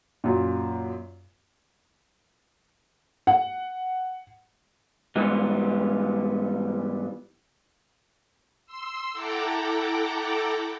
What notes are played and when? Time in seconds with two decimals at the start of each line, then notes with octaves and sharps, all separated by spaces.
0.24 F#2 A#2
3.27 F#5
5.16 G#2 E3 G3 B3
8.66 C6 E6
9.13 E4 A4 F#5 G5 A#5 D6